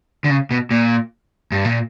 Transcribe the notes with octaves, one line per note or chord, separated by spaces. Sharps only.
D3
C#3
B2
A#2
G2
A#2